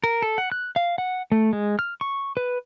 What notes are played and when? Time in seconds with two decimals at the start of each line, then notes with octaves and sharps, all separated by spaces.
0.04 A#4
0.22 A4
0.38 F#5
0.52 F#6
0.76 F5
0.98 F#5
1.32 A3
1.53 G#3
1.79 F6
2.01 C#6
2.37 B4